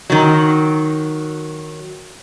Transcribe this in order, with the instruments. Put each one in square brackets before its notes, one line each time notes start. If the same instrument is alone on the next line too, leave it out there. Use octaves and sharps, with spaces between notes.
[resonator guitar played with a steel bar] D#3 F#3